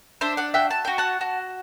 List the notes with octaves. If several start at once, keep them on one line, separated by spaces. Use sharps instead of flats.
D4 C5 E5
D5 F#5
F#4 E5 G5
A5
F#4 G5
F#5 A5
F#4